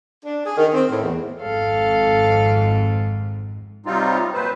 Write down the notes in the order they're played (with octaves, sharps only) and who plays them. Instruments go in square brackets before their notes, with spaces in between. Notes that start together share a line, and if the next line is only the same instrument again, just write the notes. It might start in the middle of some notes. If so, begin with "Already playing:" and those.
[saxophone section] D4
G#4
D#3
C4
A2
E2
[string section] G#1 F2 G#2 [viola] A4 F5
[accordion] C3 F#3 G3 C4 D#4 F4
F2 A#2 F#3 B4 C5